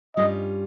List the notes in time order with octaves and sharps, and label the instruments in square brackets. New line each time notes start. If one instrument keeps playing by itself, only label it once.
[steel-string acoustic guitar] G2 G3 C#4 F4 [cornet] D#5